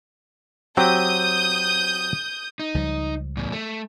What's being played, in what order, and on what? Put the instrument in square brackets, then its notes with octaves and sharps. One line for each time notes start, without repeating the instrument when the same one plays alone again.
[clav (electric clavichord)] F#3 C4 G4 [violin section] D#6 G6
[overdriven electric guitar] D#4
[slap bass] C#2 F3 G3
[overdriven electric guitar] E2 A2
A3